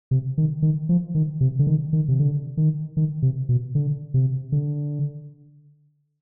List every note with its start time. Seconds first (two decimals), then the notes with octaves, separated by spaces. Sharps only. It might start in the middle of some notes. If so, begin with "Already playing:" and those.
0.11 C3
0.38 D#3
0.62 D#3
0.89 F3
1.15 D#3
1.41 C3
1.59 D3
1.67 D#3
1.93 D#3
2.08 C3
2.19 D3
2.57 D#3
2.97 D#3
3.22 C3
3.49 B2
3.75 D3
4.14 C3
4.52 D3